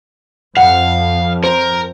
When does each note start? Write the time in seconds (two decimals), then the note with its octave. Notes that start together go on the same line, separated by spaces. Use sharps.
0.57 F2 F5 F#5
1.44 A#4 C5